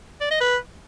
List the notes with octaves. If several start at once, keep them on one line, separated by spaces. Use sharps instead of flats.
D5
D#5
B4